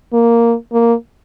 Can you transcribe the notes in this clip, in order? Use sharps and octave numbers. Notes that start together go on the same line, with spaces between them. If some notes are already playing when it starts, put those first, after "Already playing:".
A#3
A#3